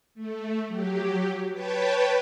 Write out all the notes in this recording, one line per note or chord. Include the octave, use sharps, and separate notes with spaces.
A3
F#3 G4
B4 C#5 G5 A5 B5